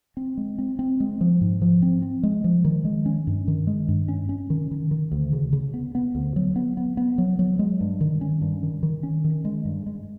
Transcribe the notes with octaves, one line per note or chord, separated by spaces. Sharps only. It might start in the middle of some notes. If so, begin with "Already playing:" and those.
C4
G#3
C4
C4
G#3
F3
G#2
F3
C4
C4
G#3
F3
D#3
G#3
C#4
G2
D#3
G#3
G2
C#4
C#4
D#3
D#3
D#3
D2
C#3
C#3
B3
B3
D2
F#3
B3
B3
B3
F#3
F#3
G#3
G2
D#3
C#4
G2
D#3
D#3
C#4
D#3
G#3
G2
G#3